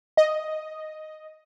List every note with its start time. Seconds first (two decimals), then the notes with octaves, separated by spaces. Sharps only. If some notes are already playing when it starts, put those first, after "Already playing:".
0.17 D#5